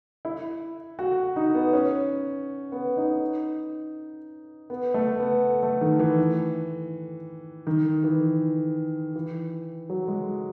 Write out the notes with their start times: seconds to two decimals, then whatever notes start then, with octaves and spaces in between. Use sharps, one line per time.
0.25 E4
0.99 F#4
1.36 D#4
1.54 B3
1.73 C#4
2.72 B3
2.97 D#4
4.70 B3
4.94 A3
5.19 B3
5.63 A3
5.81 D#3
5.99 E3
7.67 D#3
8.04 E3
9.15 E3
9.90 F#3
10.08 G#3